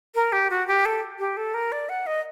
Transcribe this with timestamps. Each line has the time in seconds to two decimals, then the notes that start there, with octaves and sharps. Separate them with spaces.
0.15 A#4
0.32 G4
0.50 F#4
0.68 G4
0.85 A4
1.19 G4
1.37 A4
1.54 A#4
1.72 D5
1.89 F#5
2.07 D#5